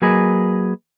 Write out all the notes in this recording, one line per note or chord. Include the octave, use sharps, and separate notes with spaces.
F#3 A#3 G#4 B4 D#5